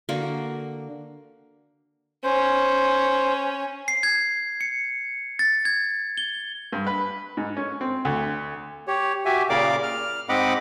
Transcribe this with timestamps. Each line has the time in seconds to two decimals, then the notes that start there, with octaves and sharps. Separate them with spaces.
0.09 D3 A#3 F#4 A#4
2.24 C#4 C5
3.88 C7
4.03 G#6
4.61 C#7
5.39 A6
5.65 G#6
6.17 G7
6.73 G2
6.87 B4
7.37 G#2
7.57 C#4
7.81 C4
8.05 D2
8.88 G4 C#5
9.25 F#4 G4 E5 G#5
9.50 A#2 C#3 A#4 D5 F5 D6
9.83 F6
10.29 G#2 C4 D#5 F#5 B5 D6